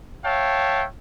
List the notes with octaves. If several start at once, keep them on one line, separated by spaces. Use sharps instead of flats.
C#5 E5 F5 G5 A5